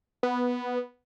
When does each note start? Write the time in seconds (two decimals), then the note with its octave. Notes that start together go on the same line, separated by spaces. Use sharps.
0.23 B3